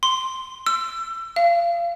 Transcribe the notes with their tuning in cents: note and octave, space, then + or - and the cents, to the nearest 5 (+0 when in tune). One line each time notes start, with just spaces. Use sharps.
C6 +0
E6 +25
F5 -25